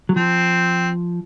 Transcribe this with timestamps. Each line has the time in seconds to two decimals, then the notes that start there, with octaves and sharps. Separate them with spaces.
0.09 F#3
0.16 F3 C4